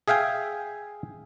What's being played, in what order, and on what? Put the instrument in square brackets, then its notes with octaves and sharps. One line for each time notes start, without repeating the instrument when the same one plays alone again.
[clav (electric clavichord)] G#4 E5 F5 G5 G#5